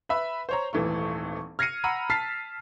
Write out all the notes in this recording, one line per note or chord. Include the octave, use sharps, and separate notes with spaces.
B4 E5 B5
C5 C#5 A#5
D#1 G#1 E3 A3 C#6
F6 G#6 A#6 C7 C#7 D#7
F#5 A#5 B5 E6 D#7
A5 F6 A6 B6 C7